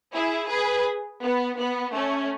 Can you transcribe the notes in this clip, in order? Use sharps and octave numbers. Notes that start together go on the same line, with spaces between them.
E4 G#4
G#4 B4
B3
B3
A3 C#4